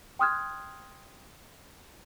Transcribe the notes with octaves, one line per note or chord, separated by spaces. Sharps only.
G5 C6 D#6 F6 F#6 G#6